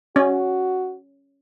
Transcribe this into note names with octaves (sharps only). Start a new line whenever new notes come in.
C#4 F#4